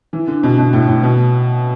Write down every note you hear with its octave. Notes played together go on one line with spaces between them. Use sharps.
E3
D3
B2
B2
A2
A2
B2